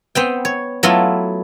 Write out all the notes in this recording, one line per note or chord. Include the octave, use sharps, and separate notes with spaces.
B3 C4 G5
C#5
F#3 A3 B3 E4 F4